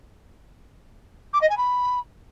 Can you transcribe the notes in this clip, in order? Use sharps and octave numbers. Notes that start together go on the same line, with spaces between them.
D6
D#5
G#5
B5